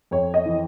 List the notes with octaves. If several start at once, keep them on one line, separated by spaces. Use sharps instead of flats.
F2 C#5
D#5
E3